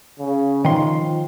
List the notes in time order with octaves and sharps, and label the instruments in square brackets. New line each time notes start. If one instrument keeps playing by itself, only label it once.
[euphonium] C#3
[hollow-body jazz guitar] D#3 C6 [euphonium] F3